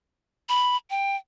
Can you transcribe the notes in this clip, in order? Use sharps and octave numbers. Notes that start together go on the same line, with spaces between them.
B5
G5